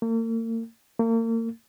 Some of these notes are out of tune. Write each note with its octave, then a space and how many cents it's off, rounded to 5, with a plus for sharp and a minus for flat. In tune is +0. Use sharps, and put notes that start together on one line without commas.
A#3 -45
A#3 -40